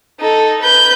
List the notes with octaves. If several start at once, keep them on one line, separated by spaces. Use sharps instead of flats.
D#4 A4
B4 G6